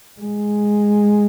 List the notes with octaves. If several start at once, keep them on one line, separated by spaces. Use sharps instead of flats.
G#3